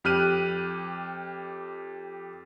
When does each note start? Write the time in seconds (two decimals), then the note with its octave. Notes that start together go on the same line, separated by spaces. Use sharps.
0.04 F2 G4 F6 F#6 D#7